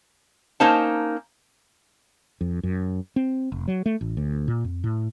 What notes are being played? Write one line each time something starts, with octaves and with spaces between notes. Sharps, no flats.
A#3 C#4 D#4 C5 A5
F2
F#2
C4
F1
F#3
A3
A1
D2
A#2
F2
A2